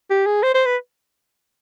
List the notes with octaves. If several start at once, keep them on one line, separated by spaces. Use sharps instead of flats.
G4
G#4
C5
C5
B4